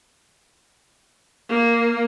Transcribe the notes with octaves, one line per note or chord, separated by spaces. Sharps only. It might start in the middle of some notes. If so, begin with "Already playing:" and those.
A#3